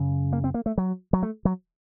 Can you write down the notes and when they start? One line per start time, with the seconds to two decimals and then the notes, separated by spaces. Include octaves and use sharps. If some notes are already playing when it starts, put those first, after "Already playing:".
Already playing: F#2 C#3
0.33 A#3
0.44 C4
0.54 A#3
0.66 A3
0.78 F#3
1.13 F#3
1.23 A3
1.45 F#3